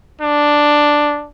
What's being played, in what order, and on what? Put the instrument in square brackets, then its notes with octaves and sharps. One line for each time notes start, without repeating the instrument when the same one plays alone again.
[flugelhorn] D4